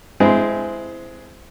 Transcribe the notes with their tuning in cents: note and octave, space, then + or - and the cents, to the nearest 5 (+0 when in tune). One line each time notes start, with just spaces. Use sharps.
G#3 +10 C4 -15 E4 +5